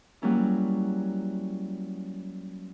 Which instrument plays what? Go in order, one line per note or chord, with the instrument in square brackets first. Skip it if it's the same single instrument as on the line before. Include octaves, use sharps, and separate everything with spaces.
[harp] F#3 G3 A#3 C#4 E4